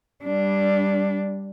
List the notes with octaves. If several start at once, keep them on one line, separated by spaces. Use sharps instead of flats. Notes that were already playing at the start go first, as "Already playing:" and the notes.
G3 D4